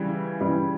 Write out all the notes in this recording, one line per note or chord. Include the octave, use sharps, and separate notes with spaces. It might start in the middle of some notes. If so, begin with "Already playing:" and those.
Already playing: C#3 E3 G3
C#3 E3 G3